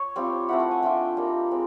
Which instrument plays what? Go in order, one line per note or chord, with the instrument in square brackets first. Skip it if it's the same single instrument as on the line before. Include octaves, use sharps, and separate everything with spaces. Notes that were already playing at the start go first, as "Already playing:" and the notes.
Already playing: [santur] C#5
G3 C4 F4
A3 C4 E4 F#5
F#5
G#5
A3 D4 F4 G5
G3 A#3 D#4
G#3 C4